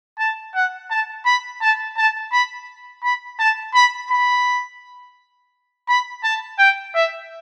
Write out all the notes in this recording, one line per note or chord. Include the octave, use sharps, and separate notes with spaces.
A5
F#5
A5
B5
A5
A5
B5
B5
A5
B5
B5
B5
A5
G5
E5